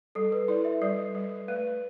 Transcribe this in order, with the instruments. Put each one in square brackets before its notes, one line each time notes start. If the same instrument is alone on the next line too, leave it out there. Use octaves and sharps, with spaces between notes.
[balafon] G3 [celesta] A4
[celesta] B4
[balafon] E4 [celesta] D5
[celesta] E5
[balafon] G3 [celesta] D5
[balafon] G3
[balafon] A3 [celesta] B4